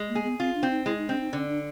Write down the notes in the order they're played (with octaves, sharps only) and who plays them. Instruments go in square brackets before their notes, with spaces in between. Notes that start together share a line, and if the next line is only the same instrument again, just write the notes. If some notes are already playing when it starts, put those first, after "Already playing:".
Already playing: [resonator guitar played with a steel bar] G#3
[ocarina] A#3
[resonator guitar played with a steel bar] G#4
[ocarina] B3
[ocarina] C4 [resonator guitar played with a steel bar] F4
[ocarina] D4
[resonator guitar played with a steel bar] C4
[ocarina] D#4
[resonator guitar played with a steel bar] G#3 [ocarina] E4
[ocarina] D#4
[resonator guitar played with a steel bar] C4 [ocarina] D4
[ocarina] D#4
[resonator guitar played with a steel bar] D3 [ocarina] C#4
[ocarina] D4